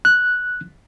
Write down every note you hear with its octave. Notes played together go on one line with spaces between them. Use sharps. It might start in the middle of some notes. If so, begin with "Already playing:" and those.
F#6